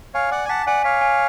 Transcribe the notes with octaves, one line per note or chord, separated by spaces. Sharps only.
C#5 F5 G#5
D5 F#5 D6
G#5
F#5 A5 B6
D5 F#5 G#5
C#5 F5 B6
G#5